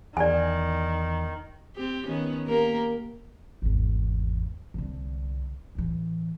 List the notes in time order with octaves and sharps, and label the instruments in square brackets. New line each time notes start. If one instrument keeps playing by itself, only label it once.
[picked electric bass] E2 [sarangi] D#3 [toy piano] D5 G#5
[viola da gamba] C4 G4
D#3 B3 C#4
A#3 G4 A#4
[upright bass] G#1 E2
C2 D3
A1 E3